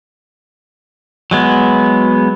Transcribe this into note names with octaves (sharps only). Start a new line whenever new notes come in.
F#3 G#3 B3